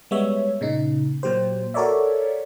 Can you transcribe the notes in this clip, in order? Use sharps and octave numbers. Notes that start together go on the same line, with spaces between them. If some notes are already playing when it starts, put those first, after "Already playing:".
G3 G#3 B3 C#5 E5
A#2 C#3 D#4
A#2 F#3 G4 C5
F#4 A4 A#4 C#5 D5 E5